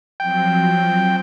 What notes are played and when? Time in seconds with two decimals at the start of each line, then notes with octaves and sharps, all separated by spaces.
0.20 F3 F#3 C4 G5